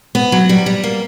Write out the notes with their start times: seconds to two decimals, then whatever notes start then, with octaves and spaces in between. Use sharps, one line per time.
0.15 B3
0.32 F#3
0.49 G3
0.66 G3
0.84 A#3